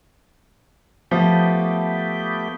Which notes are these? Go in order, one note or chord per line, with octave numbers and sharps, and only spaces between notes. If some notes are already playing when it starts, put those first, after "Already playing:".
F3 A3 B3 G4